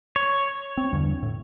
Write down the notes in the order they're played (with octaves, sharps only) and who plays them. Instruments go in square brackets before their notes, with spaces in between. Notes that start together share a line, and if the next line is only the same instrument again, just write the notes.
[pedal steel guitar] C#5
[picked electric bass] C4
E2 G2 D3
A2